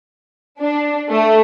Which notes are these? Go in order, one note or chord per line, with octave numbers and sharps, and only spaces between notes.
D4
A3